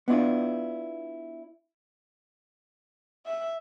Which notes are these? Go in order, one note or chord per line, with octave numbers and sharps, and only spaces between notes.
B3 D4 E4 F4
E5